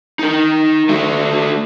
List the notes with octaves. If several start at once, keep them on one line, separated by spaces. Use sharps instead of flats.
D#4 A#4
A3 F#4